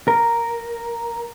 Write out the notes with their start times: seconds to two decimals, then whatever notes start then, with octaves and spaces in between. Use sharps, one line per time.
0.08 A#4